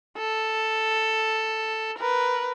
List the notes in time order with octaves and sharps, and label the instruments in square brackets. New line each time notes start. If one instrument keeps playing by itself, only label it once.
[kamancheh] A4
A#4 B4